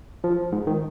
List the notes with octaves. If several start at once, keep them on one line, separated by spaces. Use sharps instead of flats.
F3
G#2
D#3